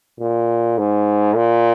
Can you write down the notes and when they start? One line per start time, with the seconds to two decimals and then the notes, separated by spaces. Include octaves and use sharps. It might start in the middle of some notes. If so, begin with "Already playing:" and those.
0.20 A#2
0.78 G#2
1.36 A#2